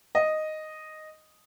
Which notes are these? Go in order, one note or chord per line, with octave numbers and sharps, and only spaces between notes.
D#5